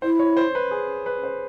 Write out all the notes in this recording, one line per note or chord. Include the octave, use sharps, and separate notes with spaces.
E4 C5
C#5
C5
B4
G#4
B4
C5